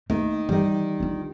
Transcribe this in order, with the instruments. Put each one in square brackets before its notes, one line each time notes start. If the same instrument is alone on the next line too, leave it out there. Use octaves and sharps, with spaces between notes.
[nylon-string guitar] D#3 [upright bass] A3 A#3
[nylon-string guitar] D#3 G3 [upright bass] E3
[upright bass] D4 F4